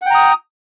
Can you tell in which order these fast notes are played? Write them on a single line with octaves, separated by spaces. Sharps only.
F#5 G5 A#5 D#6